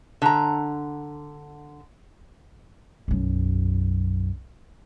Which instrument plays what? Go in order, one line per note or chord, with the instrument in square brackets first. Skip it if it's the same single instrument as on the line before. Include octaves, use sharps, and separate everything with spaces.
[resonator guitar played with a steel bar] D3 A#5
[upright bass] B1 F#2